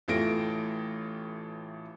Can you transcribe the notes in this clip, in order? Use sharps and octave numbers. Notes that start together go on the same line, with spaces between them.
A1 E3 A3 F4 A#6 D7